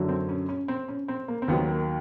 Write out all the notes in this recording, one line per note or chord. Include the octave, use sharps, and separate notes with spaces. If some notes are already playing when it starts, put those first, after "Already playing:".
Already playing: F#2 D3 F#3
C4
C#4
C#4
C4
C#4
C4
A#3
C4
D#2 D#3 F#3 B3
A#3